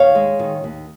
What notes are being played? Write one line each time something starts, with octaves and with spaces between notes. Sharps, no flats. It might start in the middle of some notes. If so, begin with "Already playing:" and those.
Already playing: D#2 C#5 F5
G#3
D#3
D#2